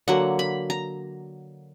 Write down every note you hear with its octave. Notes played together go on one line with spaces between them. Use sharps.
D3 F#3 A#3 F#5
B5
A#5